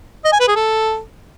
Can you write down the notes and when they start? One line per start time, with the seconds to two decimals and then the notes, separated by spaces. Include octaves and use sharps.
0.25 D#5
0.33 G#5
0.40 B4
0.48 G#4
0.56 A4